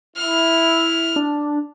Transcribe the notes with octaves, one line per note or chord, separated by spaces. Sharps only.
E4 F6
D4